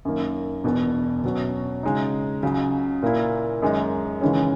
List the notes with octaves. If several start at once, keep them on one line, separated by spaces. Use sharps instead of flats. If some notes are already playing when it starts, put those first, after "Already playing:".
F#2 D#3 A#3
E1 E2 B2
B2 F#3 C#4
C#3 G#3 D#4
C#2 C#3 F#3
A#2 A#3 E4
F#2 D#3 G#3 D#4
D#2 C#3 E3 G#3 C#4